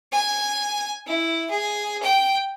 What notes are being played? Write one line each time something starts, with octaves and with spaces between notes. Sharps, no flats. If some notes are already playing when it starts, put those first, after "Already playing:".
G#5
E4
G#4
G5